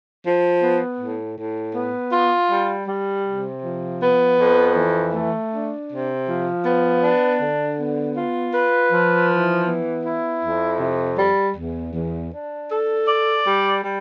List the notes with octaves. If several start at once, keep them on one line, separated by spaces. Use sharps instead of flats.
F3
B3
A2
A2
B3
F4
G3
G3
C3
F3
B3
F2
E3
A3
D4
C3
F3
B3
D4
D3
B3
F4
B4
F3
E3
B3
E4
F2
C3
G3
E2
E2
D4
A4
D5
G3
G3